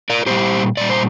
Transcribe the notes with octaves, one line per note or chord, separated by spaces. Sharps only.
A#4 D5
A#2 G3 G4 C5
A#2 G3 D5
C5